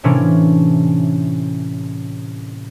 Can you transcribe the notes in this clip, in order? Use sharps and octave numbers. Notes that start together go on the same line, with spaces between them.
A2 C3 E3 A#3 C#4 D4